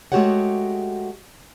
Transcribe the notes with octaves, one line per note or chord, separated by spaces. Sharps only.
G#3 A3 F#4 G4 C#5 F#5